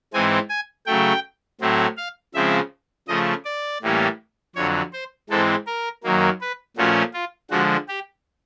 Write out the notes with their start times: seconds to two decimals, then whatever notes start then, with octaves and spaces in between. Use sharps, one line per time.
0.14 G#2 E3 G#3 C4 G#5
0.49 G#5
0.86 C#3 F#3 A3 G5
1.61 A2 F#3 A3 C4
1.97 F5
2.34 C#3 F3 G#3 C4 E5
3.08 C#3 F3 A3 D#5
3.45 D5
3.82 A2 E3 G3 A#3 C#4
4.55 F2 D3 F#3 C#5
4.93 C5
5.29 G#2 E3 G#3 C4 A4
5.67 A#4
6.03 F#2 D#3 F#3 A#3
6.41 B4
6.77 A#2 F3 A3 C#4 F#4
7.14 F4
7.51 D3 F3 G#3 F#4
7.88 G4